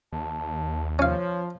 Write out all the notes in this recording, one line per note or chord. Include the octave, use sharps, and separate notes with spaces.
D#2 A5
F3 C#4 C#5 F5